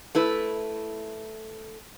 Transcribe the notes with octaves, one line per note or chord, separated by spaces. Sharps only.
A3 E4 B4